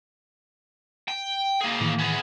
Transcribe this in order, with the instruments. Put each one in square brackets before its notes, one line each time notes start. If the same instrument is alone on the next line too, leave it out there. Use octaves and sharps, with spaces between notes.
[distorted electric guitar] G5
A#3 G#4
[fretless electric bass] A2 D#3 E3
[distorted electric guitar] B3 G#4